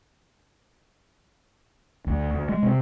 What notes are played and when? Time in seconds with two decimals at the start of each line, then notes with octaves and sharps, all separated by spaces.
2.07 D2
2.31 D2
2.49 G#3
2.62 C3